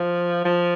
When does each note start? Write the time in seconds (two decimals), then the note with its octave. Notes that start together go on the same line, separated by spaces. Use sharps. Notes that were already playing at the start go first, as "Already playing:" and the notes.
Already playing: F3
0.45 F3